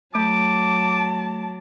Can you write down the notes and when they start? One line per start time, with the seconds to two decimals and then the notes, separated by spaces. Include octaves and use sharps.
0.15 F#3 A3 A5 D6